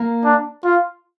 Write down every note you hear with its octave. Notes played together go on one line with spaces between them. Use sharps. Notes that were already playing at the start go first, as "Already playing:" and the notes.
Already playing: A#3 A#4
D4
F4